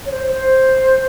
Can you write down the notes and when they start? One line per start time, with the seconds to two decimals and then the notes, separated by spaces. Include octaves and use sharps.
0.06 C#5
0.11 C5
0.32 C5